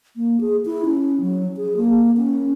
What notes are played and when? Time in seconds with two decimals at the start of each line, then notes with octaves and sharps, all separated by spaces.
0.16 A#3
0.41 G#4
0.66 E4
0.85 C#4
1.21 F#3
1.57 G#4
1.77 A#3
2.17 C#4